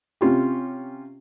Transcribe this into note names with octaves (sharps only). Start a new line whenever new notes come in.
C3 C#4 F4 G4